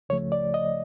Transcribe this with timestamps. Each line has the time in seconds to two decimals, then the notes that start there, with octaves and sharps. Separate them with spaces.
0.09 C#2 C#3 F3 A3 C#5
0.32 D5
0.54 D#5